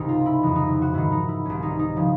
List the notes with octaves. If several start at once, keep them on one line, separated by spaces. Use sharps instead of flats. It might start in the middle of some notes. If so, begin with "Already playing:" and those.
Already playing: C#2 G#2 C3 D#3 D#4 G4
F4
E4
F2 C#3 E3 D#4
D#4
E4
F#4
G#2 D#3 E4
D#4
E4
C2 B2 C#4
D#4
D#4
C#3 F3